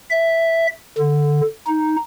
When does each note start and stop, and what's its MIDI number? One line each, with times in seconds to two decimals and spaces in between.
0.10 0.67 76
0.98 1.41 50
1.67 1.96 63